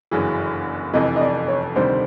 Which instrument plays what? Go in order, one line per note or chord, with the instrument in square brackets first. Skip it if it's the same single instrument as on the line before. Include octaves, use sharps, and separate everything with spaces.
[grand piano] G1 F#2 C#3 E3
[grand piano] F1 F2 C3 E3 [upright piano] D#5
[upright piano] D#5
D5
C#5
[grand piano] D2 C3 D#3 G3 [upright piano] C5